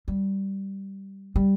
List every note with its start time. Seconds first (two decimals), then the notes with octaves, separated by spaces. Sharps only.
0.08 G3
1.36 G3